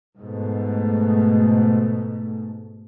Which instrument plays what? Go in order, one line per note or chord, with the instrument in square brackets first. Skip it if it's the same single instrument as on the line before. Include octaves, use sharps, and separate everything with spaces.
[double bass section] G#2 B2 A3